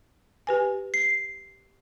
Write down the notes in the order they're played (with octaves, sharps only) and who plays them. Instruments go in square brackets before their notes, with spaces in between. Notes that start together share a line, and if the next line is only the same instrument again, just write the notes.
[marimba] G4 B4 G#5
[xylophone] C7